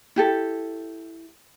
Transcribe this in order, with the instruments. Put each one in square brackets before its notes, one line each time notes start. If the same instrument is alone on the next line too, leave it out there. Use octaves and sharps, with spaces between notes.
[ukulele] E4 G4 A4